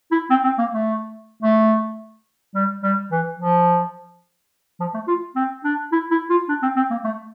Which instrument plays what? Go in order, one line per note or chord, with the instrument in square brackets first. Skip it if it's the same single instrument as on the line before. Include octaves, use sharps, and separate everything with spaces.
[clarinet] E4
C4
C4
A#3
A3
A3
G3
G3
E3
F3
F3
A3
F4
C4
D4
E4
E4
F4
D4
C4
C4
A#3
A3